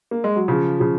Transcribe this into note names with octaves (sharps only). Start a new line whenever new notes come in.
A#3
G#3
F#3
C#3 F3
C#3 F3